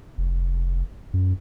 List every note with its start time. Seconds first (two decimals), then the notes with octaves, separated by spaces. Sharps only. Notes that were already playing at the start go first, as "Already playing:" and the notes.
0.18 F1
1.13 F#2